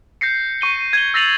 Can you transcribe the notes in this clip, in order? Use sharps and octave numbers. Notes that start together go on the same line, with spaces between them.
G6 A#6 C7 C#7
C#6 D#7 G7
G#6 G7
E6 A6 A#6 C7 F7 F#7